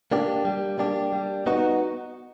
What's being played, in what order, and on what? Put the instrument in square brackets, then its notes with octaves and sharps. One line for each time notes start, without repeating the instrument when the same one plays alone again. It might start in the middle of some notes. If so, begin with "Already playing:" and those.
[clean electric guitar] A#3 D4 G4
G3
A#3 D4 G4
G3
B3 D#4 F#4